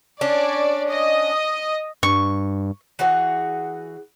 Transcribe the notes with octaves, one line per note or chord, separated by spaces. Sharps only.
C#4 D4 D5
D#5
G2 C#6
E3 F#4 G#4 C#5